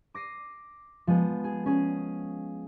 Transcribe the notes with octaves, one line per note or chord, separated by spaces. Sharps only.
D6 A#6 C7 D#7
F3 G#3 B3
G#4
C#4 G#4